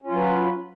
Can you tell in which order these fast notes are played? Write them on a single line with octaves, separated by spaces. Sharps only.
C#4 F4 F#3 B4